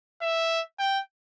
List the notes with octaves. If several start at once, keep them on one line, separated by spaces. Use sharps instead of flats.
E5
G5